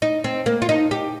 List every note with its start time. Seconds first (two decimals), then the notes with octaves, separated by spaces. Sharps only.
0.02 D#4
0.24 C4
0.46 A#3
0.62 F4
0.69 D#4
0.91 G4